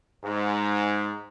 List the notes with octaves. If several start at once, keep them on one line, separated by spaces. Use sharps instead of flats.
G#2